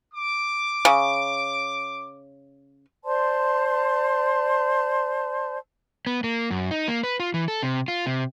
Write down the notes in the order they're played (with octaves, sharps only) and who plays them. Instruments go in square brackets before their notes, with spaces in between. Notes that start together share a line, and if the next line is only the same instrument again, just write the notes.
[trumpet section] D6
[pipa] C#3
[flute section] C5 D5 A5 C6
[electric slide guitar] B3
A#3
F#2
D#4
A#3
B4
F4
E3
A4
C3
F4
C3